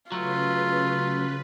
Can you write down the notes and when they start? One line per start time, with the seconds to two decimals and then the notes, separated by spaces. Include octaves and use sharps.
0.12 C#3 F#3 A3 F4 B4